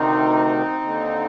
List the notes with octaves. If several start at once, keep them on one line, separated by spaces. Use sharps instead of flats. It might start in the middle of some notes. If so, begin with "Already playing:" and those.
Already playing: D2 C3 D#3 C4 D#4
D#2 D3